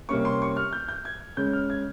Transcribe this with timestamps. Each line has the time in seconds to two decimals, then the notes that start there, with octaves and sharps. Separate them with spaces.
0.09 C3 G3 A#3 C#4 C#6
0.25 C6
0.42 C#6
0.57 F6
0.73 G6
0.89 G6
1.05 G#6
1.37 C#3 G#3 C#4 G6
1.53 F6
1.70 G#6